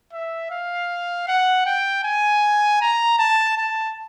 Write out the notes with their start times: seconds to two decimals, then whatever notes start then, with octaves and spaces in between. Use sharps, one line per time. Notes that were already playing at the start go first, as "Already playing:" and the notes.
0.13 E5
0.51 F5
1.28 F#5
1.66 G5
2.04 G#5
2.81 A#5
3.19 A5
3.58 A5